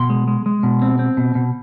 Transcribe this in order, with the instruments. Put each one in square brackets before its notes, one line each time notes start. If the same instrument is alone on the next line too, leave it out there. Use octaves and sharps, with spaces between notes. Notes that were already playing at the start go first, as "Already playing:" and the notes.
Already playing: [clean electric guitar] B2 C6
G#3
G#3
G#3
B2
C4
C4
B2
B2